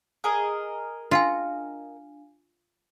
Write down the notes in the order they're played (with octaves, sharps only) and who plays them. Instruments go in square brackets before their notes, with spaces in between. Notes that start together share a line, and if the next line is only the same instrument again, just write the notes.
[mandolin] G#4 A#4 D#5
[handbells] D4 F5 G#5 [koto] F4